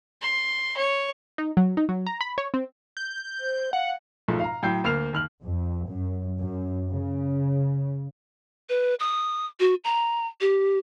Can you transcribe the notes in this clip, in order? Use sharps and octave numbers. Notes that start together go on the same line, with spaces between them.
C6
C#5
D#4
F#3
D#4
F#3
A#5
B5
C#5
C4
G6
C5
F5 F#5
B1 G#2 F3 A3
F5 A#5
A2 F#3 G5 G6 C7
D2 A#3 F6 C7 F7
D#2 F6 F#7
F2
F#2
F#2
C#3
B4
D#6
F#4
A#5
G4